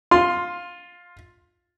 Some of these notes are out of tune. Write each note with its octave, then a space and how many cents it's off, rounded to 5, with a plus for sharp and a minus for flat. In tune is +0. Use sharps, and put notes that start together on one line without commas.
F4 +10 C6 +0